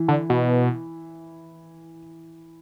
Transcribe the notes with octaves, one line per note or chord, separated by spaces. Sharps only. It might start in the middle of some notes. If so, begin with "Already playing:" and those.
Already playing: E3
D3
B2